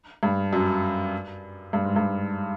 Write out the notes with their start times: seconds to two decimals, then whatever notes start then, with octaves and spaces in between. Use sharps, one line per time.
0.23 G2
0.53 F#2
1.73 G2
1.84 G#2
1.96 G2